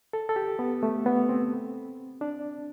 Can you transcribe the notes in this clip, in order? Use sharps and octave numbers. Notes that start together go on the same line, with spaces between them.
A4
A4
G4
B3
A3
B3
C4
D4